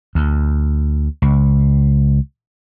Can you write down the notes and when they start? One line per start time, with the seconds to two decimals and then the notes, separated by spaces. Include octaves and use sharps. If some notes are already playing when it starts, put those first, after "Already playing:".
0.15 D2
1.22 C#2